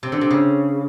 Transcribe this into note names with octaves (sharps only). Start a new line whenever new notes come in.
C3
D3
C3
C#3